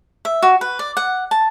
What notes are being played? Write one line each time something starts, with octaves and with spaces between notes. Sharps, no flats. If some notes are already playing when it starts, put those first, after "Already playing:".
E5
F#4
B4
D5
F#5
A5